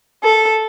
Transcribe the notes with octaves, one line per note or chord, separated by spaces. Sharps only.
A4